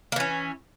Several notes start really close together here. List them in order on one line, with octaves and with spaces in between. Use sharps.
A#3 E3 C#4